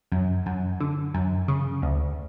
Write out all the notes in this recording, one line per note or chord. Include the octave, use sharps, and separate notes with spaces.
F#2
F#2
D3
F#2
C#3
D2